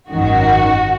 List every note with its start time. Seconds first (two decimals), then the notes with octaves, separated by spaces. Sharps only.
0.10 G#1 F#2 D#3 F#4